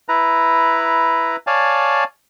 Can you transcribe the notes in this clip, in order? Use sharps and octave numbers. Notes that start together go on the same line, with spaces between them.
E4 B4 A#5
C#5 D5 F5 G#5 A5